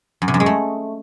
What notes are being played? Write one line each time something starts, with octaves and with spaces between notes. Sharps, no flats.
F#2
C3
F#2
G#3
A3